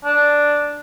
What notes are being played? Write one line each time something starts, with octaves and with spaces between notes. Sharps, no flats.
D4